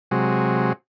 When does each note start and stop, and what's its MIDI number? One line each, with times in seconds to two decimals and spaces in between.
0.11 0.73 48
0.11 0.73 54
0.11 0.73 56